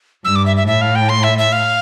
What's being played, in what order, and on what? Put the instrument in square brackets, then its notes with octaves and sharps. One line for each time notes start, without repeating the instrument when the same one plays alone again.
[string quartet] G2 [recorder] E6
[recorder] D6
E5
E5
[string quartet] A2 [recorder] E5
[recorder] F5
G5
C6
E5
E5
F5